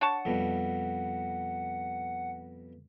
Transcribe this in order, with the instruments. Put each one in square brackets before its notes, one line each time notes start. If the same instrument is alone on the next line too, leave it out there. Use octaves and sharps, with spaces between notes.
[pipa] D4 C#5 A5 [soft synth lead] F#5
[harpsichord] F2 B2 G3